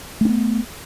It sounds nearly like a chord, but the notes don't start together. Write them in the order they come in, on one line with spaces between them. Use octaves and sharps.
A3 D4 B3